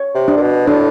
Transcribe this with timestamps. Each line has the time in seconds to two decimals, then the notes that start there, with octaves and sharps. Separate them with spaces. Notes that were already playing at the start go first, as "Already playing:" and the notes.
Already playing: C#5
0.15 C3
0.28 D4
0.37 A#2
0.41 B2
0.67 A2 D4